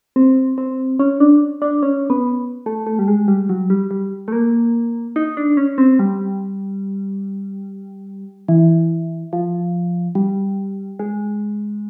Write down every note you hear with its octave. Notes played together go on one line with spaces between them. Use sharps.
C4
C4
C#4
D4
D4
C#4
B3
A3
A3
G3
G#3
G3
F#3
G3
G3
A3
A#3
D#4
D4
C#4
C4
G3
E3
F3
G3
G#3